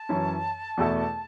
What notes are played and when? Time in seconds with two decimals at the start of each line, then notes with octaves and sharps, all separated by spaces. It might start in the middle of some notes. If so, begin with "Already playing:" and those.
Already playing: A5
0.09 F#2 E3 C#4
0.77 E2 B2 A3 E4 A4